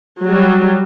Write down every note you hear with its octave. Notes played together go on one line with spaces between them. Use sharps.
F#3 G3